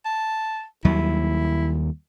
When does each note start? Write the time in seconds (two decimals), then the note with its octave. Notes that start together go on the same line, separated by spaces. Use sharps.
0.05 A5
0.85 D#2 F#3 G3 E4